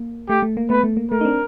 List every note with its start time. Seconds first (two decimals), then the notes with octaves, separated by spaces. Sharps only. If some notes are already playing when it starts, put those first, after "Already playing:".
Already playing: A#3
0.29 A3 G4
0.42 A3
0.57 A#3
0.70 A3 B3 B4
0.83 A3
0.97 A#3
1.11 A3 A#4
1.21 D#4
1.25 C4 D4